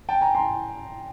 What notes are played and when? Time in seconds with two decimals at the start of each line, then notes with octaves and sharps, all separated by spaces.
0.09 G5 A5
0.21 G#5 A#5
0.35 A#5 C6